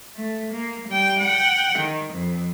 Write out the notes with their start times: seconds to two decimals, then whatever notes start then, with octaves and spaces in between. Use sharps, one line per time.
0.16 A3
0.52 A#3
0.88 G3 G5
1.20 F#5 G5
1.78 D#3
2.13 F2